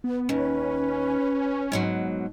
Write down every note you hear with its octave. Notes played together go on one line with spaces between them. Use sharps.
B3
D#2 C#4 B4
G#2 B2 F#3